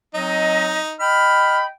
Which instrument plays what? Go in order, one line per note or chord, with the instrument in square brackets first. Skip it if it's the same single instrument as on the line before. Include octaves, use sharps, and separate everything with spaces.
[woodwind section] F#3 C4 D#5 [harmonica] D#4
[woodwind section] D#5 G5 B5 [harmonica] F6